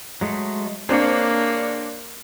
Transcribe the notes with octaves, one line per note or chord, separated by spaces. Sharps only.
F#3 G#3 A3
A#3 C4 D4 G#4 C#5